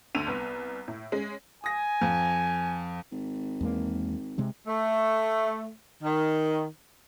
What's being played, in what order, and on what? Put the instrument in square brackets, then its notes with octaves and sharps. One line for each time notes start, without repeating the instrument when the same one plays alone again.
[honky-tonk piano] D2 D3 E6 D#7 F7
C2 B3
A2
G#3 C#4
[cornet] G#5 [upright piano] D#6 A#6
[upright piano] F2
[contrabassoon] G#1
[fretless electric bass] E2 G#3 A#3
C3 G#3 C4
[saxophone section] A3
D#3